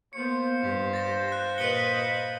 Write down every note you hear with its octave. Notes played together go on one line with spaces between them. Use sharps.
A#3 B3 F4 C5 C#7
G2 G4
A6 A#6 E7
F#6 A#6
A#2 B4 D#5 C#7 G7